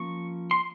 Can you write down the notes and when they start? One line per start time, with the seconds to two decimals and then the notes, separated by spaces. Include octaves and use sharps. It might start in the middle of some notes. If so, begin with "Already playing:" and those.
Already playing: F3 A#3 C#4 C#6
0.51 C6